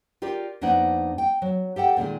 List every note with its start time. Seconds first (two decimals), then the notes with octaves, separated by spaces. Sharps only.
0.22 F4 G4 A#4 D5
0.61 F2 A#3 B3 D4 D#4 F#5
1.18 G5
1.42 F#3
1.76 G4 A4 F#5 G5
1.97 A#2 D3 D#3 G#3